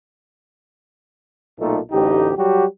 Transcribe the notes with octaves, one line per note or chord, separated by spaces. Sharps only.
B1 A#2 A3 D#4 A4
A1 D2 D#4 G4
F#3 G3 F#4 G4